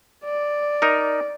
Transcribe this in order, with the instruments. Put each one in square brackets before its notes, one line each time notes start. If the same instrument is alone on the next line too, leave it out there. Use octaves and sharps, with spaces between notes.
[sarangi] D5
[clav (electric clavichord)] D#4 A#4